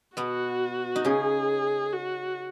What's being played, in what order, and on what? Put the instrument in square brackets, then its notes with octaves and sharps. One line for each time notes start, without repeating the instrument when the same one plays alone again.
[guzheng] B2 B3 [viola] F#4
[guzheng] D#4
[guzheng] C#3 C#4 [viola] G#4
[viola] F#4